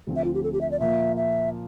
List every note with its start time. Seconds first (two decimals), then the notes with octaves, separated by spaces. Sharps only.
0.07 D2 D3 F3 C4
0.16 E5
0.24 F4
0.34 G4
0.43 A4
0.53 G4
0.61 E5
0.71 D5
0.80 A#2 F3 A#3 F4 E5
1.17 E5